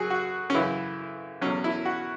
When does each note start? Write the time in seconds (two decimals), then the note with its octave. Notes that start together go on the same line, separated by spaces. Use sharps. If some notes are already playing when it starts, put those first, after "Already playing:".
Already playing: F#2 F#3 F#4 G#4
0.10 F#4
0.50 C#4
0.54 F#2 C#3 E3 E4
1.41 E2 B2 F#3 C#4
1.64 E4
1.85 F#4